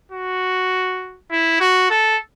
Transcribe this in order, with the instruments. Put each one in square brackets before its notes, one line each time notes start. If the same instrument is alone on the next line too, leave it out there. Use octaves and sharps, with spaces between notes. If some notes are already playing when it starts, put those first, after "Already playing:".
[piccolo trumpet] F#4
E4
F#4
A4